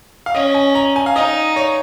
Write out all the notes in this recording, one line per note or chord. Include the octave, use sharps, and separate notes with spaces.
F5
C#4 D#5
G#5
A#5
G#5
F5
D#4 D#5
C#5